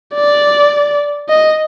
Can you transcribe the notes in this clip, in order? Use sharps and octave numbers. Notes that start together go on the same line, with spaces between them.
D5
D#5